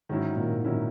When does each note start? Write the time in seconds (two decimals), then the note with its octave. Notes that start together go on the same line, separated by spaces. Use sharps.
0.09 G#2 D#3 F#3 C#4 E4
0.37 A#2
0.64 A#2 D#3 F#3 C#4 E4